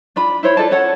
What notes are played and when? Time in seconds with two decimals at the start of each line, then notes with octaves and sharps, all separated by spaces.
0.16 D4 F4 B5
0.43 E4 C5 C#5 B5
0.57 F4 A4 D5 A5
0.71 C#4 A4 C#5 F#5